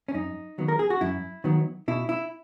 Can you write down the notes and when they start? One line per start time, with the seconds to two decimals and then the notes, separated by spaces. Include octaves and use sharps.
0.08 C#4
0.14 F#2 D#4
0.58 D#3 F#3 B3
0.68 A#4
0.79 G#4
0.90 F#4
1.01 F#2 E4
1.44 D#3 F#3 B3
1.88 B2 E4
2.09 E4